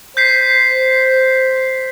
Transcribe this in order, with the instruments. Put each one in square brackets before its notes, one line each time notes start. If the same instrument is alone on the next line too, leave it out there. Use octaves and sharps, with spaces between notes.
[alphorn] C5 [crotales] G6 B6 C7